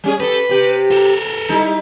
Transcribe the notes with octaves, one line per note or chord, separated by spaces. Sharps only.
G3 C#4 G#4
G4 A4 B4
C3 G4
A4 A#4
G3 D#4 E4